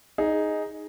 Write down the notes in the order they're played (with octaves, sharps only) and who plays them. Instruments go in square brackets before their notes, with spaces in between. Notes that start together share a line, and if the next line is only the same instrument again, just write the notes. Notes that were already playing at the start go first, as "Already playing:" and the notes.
[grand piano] D#4 G#4